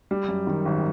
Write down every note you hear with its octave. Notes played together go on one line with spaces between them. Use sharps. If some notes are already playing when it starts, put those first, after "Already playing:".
G3
F#2
D#3
G#1